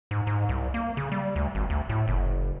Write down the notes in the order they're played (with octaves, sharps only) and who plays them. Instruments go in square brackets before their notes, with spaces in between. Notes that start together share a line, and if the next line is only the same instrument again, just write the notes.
[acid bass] G#2
G#2
C2
A#3
C#3
G3
D2
G#1
D2
A2
F#1